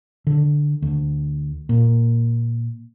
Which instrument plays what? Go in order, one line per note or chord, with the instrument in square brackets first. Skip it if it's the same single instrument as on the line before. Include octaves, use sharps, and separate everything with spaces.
[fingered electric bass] D3
D2
A#2